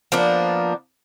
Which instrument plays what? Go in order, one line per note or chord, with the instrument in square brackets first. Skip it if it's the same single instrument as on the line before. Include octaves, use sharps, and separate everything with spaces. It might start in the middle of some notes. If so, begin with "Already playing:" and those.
[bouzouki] F3 A#3 B3 D4